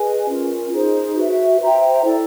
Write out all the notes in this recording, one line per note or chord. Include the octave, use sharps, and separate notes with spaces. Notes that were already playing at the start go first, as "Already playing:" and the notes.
Already playing: G#4 B4 D#5 G#5
C#4 F4 A#4
D#4 G#4 C5
F#4 B4 E5
C5 E5 G5 A#5
E4 A4 D5